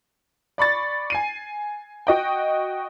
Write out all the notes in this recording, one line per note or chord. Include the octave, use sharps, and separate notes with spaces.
D5 B5 C#6 A6
G#5 C7 D#7
F#4 D#5 G5